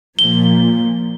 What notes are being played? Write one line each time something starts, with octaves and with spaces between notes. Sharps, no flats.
A#2 F3 G7